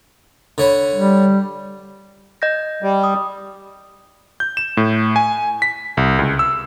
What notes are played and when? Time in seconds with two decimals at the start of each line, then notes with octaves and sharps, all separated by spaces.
0.58 D3 C#5 B5
0.95 G3
2.42 D#5 G6 A#6
2.83 G3
3.04 D#6
4.40 G6
4.57 E7
4.77 A2
5.16 G#5
5.62 B6
5.97 C2
6.19 C#2
6.39 E6